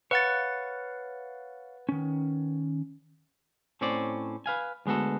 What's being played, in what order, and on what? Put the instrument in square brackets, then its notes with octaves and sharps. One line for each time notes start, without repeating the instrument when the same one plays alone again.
[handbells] B4 F#5 A6 [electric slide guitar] C#5 F5
[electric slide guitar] D#3 C#4
[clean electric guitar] A2 C4 C#4 C5 D5
B4 F5 G#5
D2 G#3 B3 F#4 A4